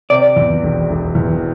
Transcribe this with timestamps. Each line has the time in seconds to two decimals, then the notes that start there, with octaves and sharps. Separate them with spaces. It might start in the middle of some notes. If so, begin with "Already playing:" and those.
0.10 C3 D5
0.36 E2
0.63 E1
0.89 E1
1.15 E2